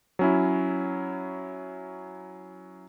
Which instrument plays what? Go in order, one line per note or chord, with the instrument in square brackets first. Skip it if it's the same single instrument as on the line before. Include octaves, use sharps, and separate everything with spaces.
[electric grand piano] F#3 C#4 E4